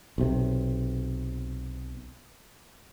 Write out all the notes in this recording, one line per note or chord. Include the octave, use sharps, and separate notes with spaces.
B1 C3